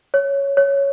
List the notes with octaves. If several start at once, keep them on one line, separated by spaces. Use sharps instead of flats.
C#5
C#5